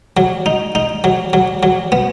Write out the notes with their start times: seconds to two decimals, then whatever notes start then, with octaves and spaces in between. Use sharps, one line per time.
0.17 F#3
0.46 D#4
0.75 D#4
1.04 F#3
1.33 F#3
1.63 F#3
1.92 B3